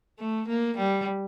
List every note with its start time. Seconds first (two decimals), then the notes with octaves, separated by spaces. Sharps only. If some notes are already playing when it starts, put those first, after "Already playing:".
0.19 A3
0.48 A#3
0.77 G3